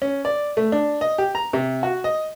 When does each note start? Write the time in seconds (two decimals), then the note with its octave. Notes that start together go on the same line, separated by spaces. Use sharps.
0.02 C#4
0.25 D5
0.57 A3
0.72 D4
1.01 D#5
1.18 G4
1.35 A#5
1.53 C3
1.83 F#4
2.04 D#5